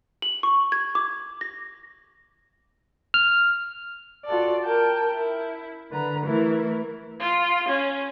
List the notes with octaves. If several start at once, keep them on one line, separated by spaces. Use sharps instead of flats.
F#7
C#6
G#6
D6
A#6
F6
F4 F#4 A4 D5
A#4 G5 A5
E4
D3 B4 A#5
E3 A3 E4 A#4 B4
F4
C#4